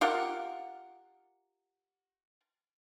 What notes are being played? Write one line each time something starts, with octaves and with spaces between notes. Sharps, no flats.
F4 G4 A#4 F#5